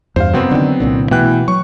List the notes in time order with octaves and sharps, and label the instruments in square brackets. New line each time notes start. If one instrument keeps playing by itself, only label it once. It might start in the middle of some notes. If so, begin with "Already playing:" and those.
[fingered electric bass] E2 G2 [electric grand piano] C5 F5
[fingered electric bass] F#2 C3 [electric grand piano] F#3 B3 C4
[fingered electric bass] D3 D#3
C2 A#2 D3
[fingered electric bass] B2 A3 B3 [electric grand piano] E3 G5 F#6
[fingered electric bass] F#3 [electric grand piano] C#6